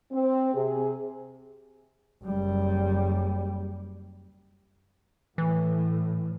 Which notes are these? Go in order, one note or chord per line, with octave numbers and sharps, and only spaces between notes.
C4
C3 G#4
F#1 G3
A2 E3